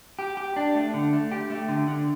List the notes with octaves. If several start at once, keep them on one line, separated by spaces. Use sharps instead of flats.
G4
G4
D4
A3
D3
A3
G4
A3
D3
D3